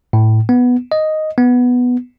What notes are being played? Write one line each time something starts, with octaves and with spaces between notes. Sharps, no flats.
A2
B3
D#5
B3